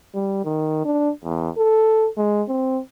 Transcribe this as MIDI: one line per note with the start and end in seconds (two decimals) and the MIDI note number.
0.14 0.43 55
0.44 0.83 51
0.85 1.11 62
1.24 1.49 40
1.57 2.09 69
2.17 2.42 56
2.48 2.80 60